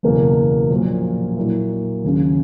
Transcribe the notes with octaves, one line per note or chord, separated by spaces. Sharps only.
F#1 E2 B2 A#3
A#1 A#2 F#3
A#2 F#3 A#3 E4
D#2 C#3 F#3 C#4